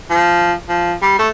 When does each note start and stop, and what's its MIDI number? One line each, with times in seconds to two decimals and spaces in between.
0.10 0.53 53
0.69 0.93 53
1.02 1.16 55
1.19 1.28 57